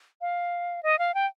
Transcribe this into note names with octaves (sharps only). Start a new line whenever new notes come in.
F5
D#5
F5
G5